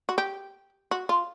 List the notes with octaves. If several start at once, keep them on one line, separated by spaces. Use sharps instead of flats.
F#4
G4
F#4
F4